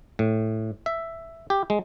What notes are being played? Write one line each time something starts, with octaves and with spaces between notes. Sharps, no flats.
A2
E5
G4
G#3